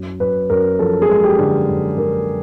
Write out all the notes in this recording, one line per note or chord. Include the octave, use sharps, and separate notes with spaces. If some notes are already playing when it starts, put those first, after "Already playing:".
Already playing: F#2
F#2 B4
F#2 A#4
F3 A4
G#4
G#3
G4
D3
F#2
D3 A#4